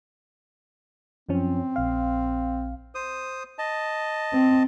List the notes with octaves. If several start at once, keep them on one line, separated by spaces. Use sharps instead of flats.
F#2 F3 C4 C#4
A#1 F5
C5 D#6
D#5 A5
C4